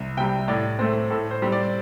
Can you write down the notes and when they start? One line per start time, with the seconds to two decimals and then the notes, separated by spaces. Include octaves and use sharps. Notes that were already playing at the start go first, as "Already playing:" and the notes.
Already playing: C2
0.17 C3 G3 G5
0.48 A2 D5
0.79 A3 C4 C5
1.10 A2 A4
1.31 C5
1.42 G3 C4
1.52 D5